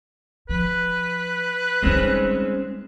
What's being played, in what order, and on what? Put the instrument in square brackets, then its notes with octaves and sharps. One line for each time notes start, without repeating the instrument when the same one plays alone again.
[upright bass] F3 [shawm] B4
[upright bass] G3 D#4 [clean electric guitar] G#3 C4 C#4